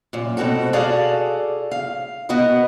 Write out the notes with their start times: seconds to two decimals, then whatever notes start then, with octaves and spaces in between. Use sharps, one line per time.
0.13 F#2 A#2
0.37 B2 G#3 C4 F#4 A4
0.73 F#4 G#4 A4 D5 F5
1.71 F5
2.29 B2 B3 F#4 A#4 D#5